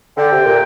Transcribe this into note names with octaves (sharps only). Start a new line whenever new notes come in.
D3 G5
C3
A#2